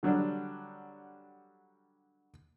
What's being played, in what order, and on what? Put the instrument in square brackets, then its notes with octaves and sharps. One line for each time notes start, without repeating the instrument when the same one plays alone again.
[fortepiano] D3 F#3 G3 D4